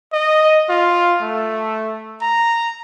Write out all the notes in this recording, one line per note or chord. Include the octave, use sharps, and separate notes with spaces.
D#5
F4
A3
A#5